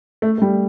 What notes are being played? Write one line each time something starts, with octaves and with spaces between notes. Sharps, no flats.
A3
A3
G3